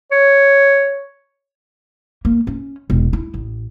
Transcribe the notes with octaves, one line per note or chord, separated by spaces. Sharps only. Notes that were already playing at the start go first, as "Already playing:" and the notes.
C#5
A#3
C#4
E1
E4
A1